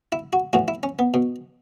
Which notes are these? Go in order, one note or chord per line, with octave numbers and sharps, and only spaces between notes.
E4
F#4
A2 E3 F#4
E4
C#4
B3
B2